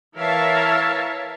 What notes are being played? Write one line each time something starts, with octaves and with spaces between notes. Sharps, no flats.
E3 A#4 C#5 E5 F5 A5